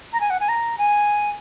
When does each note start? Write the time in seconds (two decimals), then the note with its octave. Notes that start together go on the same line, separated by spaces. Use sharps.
0.13 A#5
0.21 G#5
0.30 F#5
0.40 G#5
0.49 A#5
0.78 G#5